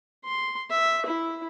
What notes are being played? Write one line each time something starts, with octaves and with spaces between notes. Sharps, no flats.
C6
E5
E4